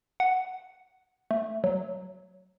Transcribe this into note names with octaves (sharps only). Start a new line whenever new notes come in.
F#5
A3
F#3